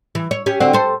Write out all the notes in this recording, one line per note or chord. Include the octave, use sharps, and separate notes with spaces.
E3
C#5
C#4 G4
D3 C4 F#4
A4 C5